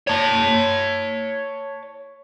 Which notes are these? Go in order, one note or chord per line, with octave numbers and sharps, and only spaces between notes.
C#5 A5